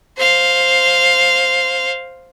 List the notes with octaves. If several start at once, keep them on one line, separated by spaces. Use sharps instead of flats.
C5 F5